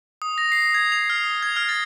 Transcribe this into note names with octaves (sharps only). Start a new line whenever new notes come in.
D#6
A#6
C7
G#6
F7
F6
D#6
G#6
F6
A6